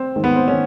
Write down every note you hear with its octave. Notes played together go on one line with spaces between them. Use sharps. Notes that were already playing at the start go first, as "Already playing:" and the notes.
Already playing: C4
G#2 D#3
B3
C4
D#3 C#4